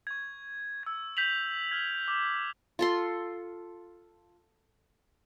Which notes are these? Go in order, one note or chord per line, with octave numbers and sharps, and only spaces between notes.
C#6 G#6
E6 G#6
G6 B6 F7 F#7
F6 G#6
D6
F4 A4 C6